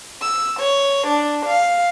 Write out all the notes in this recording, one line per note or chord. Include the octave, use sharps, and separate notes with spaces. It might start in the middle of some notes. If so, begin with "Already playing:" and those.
E6
C#5
D4
F5